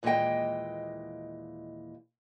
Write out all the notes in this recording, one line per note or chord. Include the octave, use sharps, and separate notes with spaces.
D#2 A#2 E3 G#3 D#5 G5